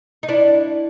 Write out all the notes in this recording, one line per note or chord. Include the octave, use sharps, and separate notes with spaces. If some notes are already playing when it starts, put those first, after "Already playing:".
D#4
D4 E4